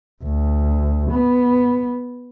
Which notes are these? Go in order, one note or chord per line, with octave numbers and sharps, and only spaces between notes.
D2
B3